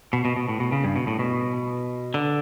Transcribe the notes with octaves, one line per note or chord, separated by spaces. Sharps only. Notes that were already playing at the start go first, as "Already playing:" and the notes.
B2
B2
B2
A2
B2
C#3
G2
B2
A2
B2
D3